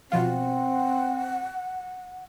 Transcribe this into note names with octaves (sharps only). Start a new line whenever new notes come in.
B2 F3 C4 F4 F#5